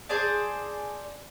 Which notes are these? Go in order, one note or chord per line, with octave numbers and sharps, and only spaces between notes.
G#4 C5 D5 A5